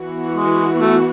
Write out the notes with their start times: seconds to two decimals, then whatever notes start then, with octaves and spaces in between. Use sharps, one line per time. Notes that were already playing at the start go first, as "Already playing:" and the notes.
Already playing: E3 B3 F#4
0.36 G#3
0.81 A3